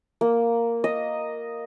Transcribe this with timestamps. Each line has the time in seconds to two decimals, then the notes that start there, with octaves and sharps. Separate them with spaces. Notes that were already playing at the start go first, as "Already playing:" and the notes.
0.21 A#3
0.84 D#5